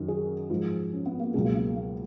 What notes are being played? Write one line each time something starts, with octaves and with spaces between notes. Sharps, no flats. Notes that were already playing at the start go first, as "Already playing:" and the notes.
Already playing: F#2 D#3 F#3
G#4
G#2 F3
C#4
B3
A#3
C#2 B2 F#3 G#3
A#3
A#3
A#3